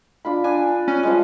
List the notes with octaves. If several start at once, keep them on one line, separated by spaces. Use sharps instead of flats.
D4 F4 B5
D4 G#5
C#4
F3 G3 G#3